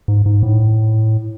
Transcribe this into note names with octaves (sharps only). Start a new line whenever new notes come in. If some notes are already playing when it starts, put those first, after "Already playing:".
G#2
G#2
A2